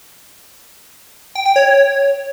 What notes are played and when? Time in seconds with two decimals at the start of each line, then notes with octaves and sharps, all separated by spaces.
1.35 G5
1.46 G5
1.56 C#5